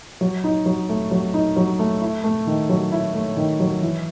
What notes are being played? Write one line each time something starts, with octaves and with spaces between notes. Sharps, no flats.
F#3
D#4
F#3
A3
F#3
D#4
F#3
A3
E4
A3
D#3
F#3
E4
A3
D#3
F#3
E3